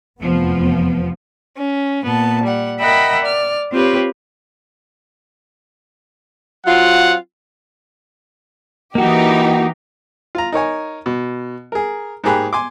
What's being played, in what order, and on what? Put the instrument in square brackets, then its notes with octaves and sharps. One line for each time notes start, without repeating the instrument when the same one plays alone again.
[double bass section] F1 E2 B3 [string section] F3
[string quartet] C#4
A#2 B3 A5
G3 F#5
A#4 D#5 E5 F#5 G5 B5
D5 F6
C4 F4 G4 B4 C#5
[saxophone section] F#3 C4 F4 [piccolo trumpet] F#5
[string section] E3 D#4 G4 [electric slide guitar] A#3 F#4
[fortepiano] F4 A#5
D#4 A#4 C#5 G#5
B2
G#4 A#4
G#2 A#3 G4 G#4 B5 F#6
G#5 C6 D6